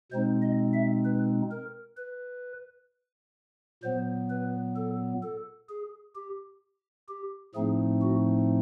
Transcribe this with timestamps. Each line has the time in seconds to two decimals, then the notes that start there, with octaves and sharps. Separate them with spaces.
0.12 B2 G#3 C4 D#4 C5
0.43 D#5
0.74 E5
1.05 B4
1.51 A#4
1.97 B4
3.83 A#2 F#3 B3 C5
4.30 B4
4.76 A4
5.23 A4
5.69 G#4
6.15 G4
7.09 G4
7.55 A2 F3 A3 C4 D#4 G#4
8.02 F#4